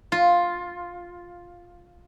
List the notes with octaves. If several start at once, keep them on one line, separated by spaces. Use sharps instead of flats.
F4